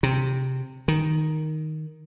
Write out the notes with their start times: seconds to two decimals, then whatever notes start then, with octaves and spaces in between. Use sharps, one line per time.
0.03 C3
0.88 D#3